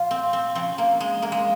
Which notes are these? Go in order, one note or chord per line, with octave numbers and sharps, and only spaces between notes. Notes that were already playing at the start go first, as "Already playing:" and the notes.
Already playing: A#2 F3 F4
C4
C4
C#3 F3 C4
A#3
G#3
A#3
G#3